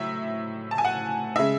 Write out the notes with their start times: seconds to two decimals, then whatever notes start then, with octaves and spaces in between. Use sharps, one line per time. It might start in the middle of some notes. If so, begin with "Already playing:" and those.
Already playing: A2 F#3 E5
0.71 A5
0.78 G#5
0.85 F#5
1.36 C#3 G#3 E5